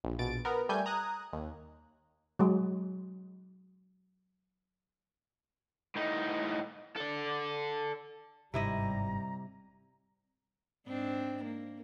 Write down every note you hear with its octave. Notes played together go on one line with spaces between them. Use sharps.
A#1
A#1 B2 A6 D7
B3 A#4
G3 A3 G#5 G6
A#5 D#6 F#6 G#6
D#2
F#3 G#3
A2 D#4
A4 D5
G1 G#2 C3 G3 E4 D#5 A#5
G#2 C4 D4
A#3